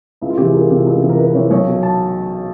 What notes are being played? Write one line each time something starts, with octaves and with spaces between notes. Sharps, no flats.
C#2 E4
F4
C3 E3 G4 G#4
C#2 A#4
C3 E3
C#2
C3 E3
A#4
C#2 B4
C3 E3 C#5
B1 C#5
B2 F#3
A5